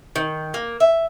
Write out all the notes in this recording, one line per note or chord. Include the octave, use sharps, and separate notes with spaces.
D#3
A#3
E5